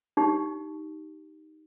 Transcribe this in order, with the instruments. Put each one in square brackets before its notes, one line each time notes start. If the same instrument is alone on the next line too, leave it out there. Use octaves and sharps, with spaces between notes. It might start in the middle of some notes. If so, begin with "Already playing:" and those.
[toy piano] D#4 G4